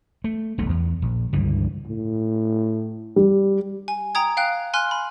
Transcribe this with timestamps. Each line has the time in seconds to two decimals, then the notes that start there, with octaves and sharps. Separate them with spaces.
0.24 A3
0.58 E1 B1 A3
0.69 E2
1.02 A#1
1.33 C#2 G2 D3 E3
1.86 A2
3.16 G3
3.88 G#5
4.15 G5 A#5 D#6 G#6
4.37 F5 G5 F#6
4.74 G#5 C6 F6 F#6
4.91 B5